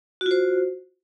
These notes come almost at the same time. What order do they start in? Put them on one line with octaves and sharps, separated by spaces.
F#4 F4 C5